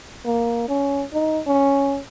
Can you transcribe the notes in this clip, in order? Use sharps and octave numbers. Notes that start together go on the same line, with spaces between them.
A#3
C#4
D#4
C#4